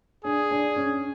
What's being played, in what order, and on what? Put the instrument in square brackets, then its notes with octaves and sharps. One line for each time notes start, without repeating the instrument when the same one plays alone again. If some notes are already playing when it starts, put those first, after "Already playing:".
[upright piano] D4 [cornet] G#4
[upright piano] D4
C#4